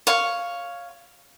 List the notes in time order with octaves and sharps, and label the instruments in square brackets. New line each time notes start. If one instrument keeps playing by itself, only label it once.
[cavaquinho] C#5 F5